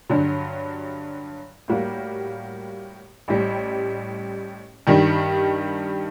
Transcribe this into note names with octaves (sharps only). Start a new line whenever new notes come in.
G2 D3 F#3
A2 G3 A#3 F#4
A1 A2 G3
G2 D#3 G3